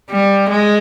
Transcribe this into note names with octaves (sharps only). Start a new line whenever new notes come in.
G3
G#3